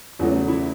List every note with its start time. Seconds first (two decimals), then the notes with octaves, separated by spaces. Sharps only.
0.19 E2 C#3 F#3 A3 F#4
0.48 E4